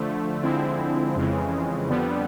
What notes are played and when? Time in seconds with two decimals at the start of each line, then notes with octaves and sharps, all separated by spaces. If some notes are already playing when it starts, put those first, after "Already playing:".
Already playing: D3 F3 A3
0.43 D3 F3 G#3 C4 E4
1.16 F2 C#3 E3 G#3
1.88 F2 D3 G3 B3